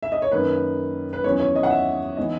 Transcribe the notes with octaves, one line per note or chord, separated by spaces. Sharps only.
E5
D#5
C#5
F#2 D#3 A#3 D#4 B4
B4
E2 D#3 F#3 C#4 C#5
C#5
D#5
F#5
E5
E3 B3 D#4 D#5